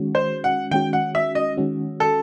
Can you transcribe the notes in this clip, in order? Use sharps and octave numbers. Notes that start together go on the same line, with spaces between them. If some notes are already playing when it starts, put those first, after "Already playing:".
Already playing: D#3 G#3 C#4 F#4
C5
F#5
D#3 G#3 C#4 F#4 G5
F#5
E5
D#5
D#3 G#3 C#4 F#4
A4